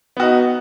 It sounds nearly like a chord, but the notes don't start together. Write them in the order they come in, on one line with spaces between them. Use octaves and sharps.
B3 F#4 D#4